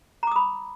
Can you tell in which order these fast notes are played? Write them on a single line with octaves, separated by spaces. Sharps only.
A#5 D6 D#6 B5